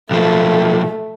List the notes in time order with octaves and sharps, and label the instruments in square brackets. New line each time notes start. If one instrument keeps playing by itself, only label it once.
[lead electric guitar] B1 F3 [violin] A3